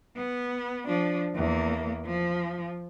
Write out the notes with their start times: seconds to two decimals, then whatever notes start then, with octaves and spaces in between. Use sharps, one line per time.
0.17 B3
0.88 F3 D4
1.35 E2 A#3
2.05 F3